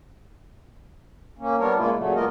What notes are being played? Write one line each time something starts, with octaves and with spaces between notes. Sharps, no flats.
A#3 C#4
G3 B3 D4 A#4 C#5
A#2 C#3 G#3 A#3 E4 F4
A#2 C#3 F#3 A3
G#3 A#3 B3 F4 A#4 D#5